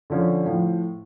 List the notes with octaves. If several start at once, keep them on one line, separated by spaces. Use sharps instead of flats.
D3 F3 C#4
A2 F3